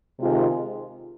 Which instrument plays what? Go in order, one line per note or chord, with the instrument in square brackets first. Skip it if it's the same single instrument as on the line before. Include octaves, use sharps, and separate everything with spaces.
[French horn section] C3 D#3 G#3 C4 F4